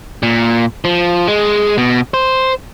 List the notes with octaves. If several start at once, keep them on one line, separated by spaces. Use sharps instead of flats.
A#2
F3
G#3
B2
C5